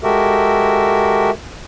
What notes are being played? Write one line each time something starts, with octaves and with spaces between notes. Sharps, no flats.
G#3 F#4 G4 A4 A#4 E5